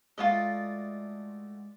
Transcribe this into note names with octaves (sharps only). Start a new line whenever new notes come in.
G#3 A3 F4 F#4 D5 D#5